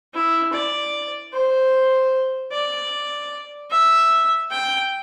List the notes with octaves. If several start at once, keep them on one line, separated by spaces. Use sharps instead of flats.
E4
D5
C5
D5
E5
G5